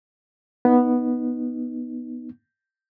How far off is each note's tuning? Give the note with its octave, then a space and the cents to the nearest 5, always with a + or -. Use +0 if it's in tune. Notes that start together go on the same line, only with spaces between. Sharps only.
B3 -5 D#4 +0